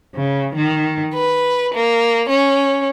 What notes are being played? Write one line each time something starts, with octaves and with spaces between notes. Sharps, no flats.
C#3
D#3
B4
A#3
C#4